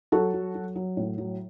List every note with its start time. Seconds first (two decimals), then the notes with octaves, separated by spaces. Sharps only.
0.12 F#3 F#4 A4
0.33 F#3
0.55 F#3
0.75 F#3
0.97 A2
1.18 F#3